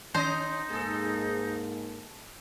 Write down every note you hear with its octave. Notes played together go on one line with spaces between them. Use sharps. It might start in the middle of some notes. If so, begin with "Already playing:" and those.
D#3 C#4 D#4 C5 D#5 A#5
G#2 A#3 G#4 A4